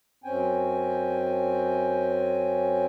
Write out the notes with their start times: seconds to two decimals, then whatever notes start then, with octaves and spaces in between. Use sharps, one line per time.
0.24 F#2 C4 C#4 G5 G#5